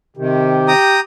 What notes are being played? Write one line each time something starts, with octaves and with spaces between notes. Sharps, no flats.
C3 D#3 G4
G5 A#5 D#6